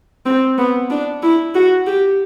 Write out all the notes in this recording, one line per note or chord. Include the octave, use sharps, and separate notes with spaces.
C4
B3
D4
E4
F#4
G4